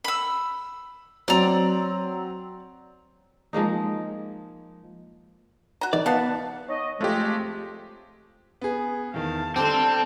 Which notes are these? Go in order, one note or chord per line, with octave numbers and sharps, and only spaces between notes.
B5 E6
F#3 C4 D5 A#5
F3 G#3 A#3 D#4
F#4 A#5
D#3 D5
B3 F5 F#5 A5
C#5 D#5
F2 G#3 A3 F4 G4
B3 G#4
E2 D#3 F5 A5
D3 G3 C4 A4 C5 A5 D6